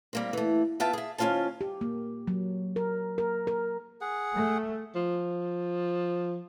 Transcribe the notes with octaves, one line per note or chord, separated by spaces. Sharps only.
G3 A#3 C4
E3 A3
B3 F4 E5 G5 A5
G#4 E5
D#2 C#4 E4 F4 C5 A5
G4
A#3
F#3
A#4
A#4
A#4
G#4 F#5
A3
F3